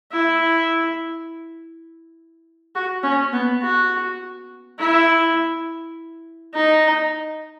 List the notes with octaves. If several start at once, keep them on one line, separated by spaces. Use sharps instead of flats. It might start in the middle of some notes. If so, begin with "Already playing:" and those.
E4
F#4
C#4
B3
F#4
E4
D#4